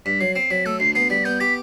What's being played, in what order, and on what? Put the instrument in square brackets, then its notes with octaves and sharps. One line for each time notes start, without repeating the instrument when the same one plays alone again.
[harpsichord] G2 [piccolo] B6
[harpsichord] F#3 [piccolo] C7
[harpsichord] C4 [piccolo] C7
[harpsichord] F#3 [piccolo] B6
[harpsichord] A3 [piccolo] E6
[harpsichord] D2 [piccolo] C7
[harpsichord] B3 [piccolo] C7
[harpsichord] G3 [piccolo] B6
[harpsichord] B3 [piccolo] G6
[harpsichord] G4 [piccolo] B6